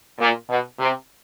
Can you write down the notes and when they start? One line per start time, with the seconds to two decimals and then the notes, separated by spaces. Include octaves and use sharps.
0.20 A#2
0.49 B2
0.79 C3